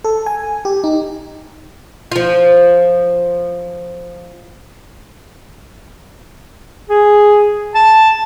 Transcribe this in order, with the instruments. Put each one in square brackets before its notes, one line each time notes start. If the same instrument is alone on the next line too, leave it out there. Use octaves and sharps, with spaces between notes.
[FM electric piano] A4
G#5
G4
D#4
[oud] F3 F4
[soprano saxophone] G#4
A5